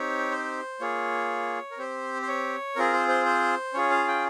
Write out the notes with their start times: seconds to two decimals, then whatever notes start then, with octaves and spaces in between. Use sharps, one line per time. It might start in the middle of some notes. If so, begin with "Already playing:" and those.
Already playing: C4 D#4 G4 C#5
0.31 C5
0.80 A#3 F4 G#4 C#5
1.71 A#4
1.78 C4 G4 C5
2.22 C5
2.28 C#5
2.76 C4 F4 G#4 A#4
2.93 C5
3.08 C5
3.26 C5
3.74 C#4 F4 G#4 C#5
3.90 F5
4.08 G5